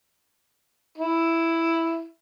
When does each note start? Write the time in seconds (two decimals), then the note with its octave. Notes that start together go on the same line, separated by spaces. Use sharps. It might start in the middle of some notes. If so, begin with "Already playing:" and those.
0.98 E4